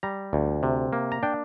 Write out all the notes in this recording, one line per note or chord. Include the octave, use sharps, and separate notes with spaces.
G3 A#5
D2
C3
A#3
A#5
D4 G5